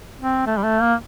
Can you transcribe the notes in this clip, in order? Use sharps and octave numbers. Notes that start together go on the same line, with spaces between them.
C4
A3
G3
A3
A#3